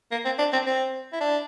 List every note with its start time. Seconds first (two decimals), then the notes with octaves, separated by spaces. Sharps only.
0.12 A#3
0.25 C4
0.39 D4
0.53 C4
0.66 C4
1.13 E4
1.21 D4